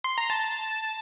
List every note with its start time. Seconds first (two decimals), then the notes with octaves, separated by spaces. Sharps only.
0.04 C6
0.18 A#5
0.30 A5